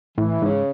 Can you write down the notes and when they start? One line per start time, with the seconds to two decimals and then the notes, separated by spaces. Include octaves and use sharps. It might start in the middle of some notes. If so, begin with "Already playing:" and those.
0.18 A2 E3
0.41 G#2 C#3